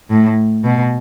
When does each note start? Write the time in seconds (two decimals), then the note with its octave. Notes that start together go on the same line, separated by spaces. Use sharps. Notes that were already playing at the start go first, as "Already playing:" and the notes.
0.10 A2
0.64 B2